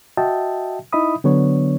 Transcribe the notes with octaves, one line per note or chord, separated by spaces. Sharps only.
F#4 D#5 E5 G5 A5
D#4 E4 D#5 E5 B5 D#6
D3 F#3 B3 D4 C#5